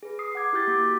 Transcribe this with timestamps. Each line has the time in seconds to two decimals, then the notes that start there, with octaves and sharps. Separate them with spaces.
0.03 G#4 B4
0.19 D#6 C7
0.35 F#5 D6 G#6
0.53 E4 G4 F6 G6 A6 B6
0.67 A#3 D6
0.84 F#4